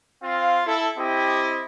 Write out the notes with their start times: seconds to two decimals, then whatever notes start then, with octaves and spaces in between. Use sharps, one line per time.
0.22 C4 F4 F5
0.65 E4 A4
0.98 C4 E4 G4 D#5